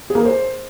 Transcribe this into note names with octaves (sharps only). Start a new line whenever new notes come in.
G#4
A#3
A#4
C5